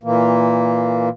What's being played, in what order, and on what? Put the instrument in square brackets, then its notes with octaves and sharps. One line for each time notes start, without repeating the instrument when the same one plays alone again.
[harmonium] A#2 E3 A#3